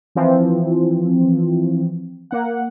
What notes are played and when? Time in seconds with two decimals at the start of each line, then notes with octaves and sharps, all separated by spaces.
0.15 E3 F3 C4
2.31 A#3 F#5